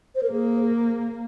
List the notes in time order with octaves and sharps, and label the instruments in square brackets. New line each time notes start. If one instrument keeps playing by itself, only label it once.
[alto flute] C5
A#4
[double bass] A#3 [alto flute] G#4